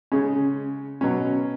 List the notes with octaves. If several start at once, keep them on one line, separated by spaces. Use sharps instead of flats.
C#3 G#3 C#4
B2 F#3 C#4